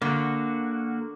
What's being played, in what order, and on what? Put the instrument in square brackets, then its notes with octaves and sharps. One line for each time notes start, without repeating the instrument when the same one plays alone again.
[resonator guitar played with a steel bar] D3 [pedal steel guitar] A#3 F#4